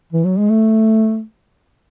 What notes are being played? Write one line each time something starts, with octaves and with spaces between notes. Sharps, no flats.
E3
F#3
G#3
A3